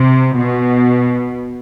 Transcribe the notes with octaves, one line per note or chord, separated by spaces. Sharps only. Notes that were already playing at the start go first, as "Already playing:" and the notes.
Already playing: C3
B2